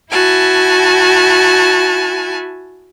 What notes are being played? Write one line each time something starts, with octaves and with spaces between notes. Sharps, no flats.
E4 F#4 G#5 A5